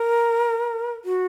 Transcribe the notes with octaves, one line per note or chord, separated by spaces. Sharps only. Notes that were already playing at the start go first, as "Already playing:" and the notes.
Already playing: A#4
F#4